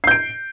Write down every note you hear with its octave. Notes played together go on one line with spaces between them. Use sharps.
G6 C7 D7